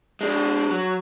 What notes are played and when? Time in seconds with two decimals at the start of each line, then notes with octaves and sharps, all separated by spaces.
0.21 G#3 D4
0.70 F#3